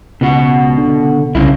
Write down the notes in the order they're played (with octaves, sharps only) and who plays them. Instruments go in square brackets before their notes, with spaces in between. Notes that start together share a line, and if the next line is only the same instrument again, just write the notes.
[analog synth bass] C#2 [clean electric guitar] B2 F#4
[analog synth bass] D3
[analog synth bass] C2 [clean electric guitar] C#3 E4